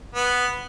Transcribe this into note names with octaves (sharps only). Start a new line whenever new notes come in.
B3